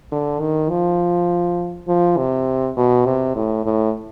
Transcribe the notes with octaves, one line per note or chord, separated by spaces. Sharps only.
D3
D#3
F3
F3
C3
B2
C3
A2
A2